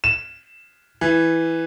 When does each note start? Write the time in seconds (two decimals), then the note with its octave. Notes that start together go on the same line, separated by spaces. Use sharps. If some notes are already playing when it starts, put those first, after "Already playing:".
0.04 E7
1.01 E3